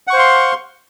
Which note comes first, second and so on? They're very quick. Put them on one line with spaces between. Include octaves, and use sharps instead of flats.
F#5 C#6 C5 F5 C6